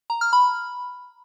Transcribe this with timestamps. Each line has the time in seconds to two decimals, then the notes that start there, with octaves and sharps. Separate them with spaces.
0.10 A#5
0.21 F6
0.33 B5